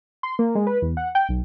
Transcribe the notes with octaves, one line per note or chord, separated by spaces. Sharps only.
C6
A#3
G#3
B4
E2
F#5
G5
B1